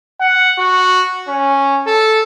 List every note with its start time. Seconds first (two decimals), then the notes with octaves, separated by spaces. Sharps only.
0.20 F#5
0.58 F#4
1.28 C#4
1.87 A4